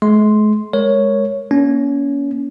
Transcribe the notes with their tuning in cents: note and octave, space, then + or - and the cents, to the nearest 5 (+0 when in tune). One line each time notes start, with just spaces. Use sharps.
G#3 +40 C6 +0
G#3 +0 A#4 +0 C#5 +0
A#3 +30 C#4 +25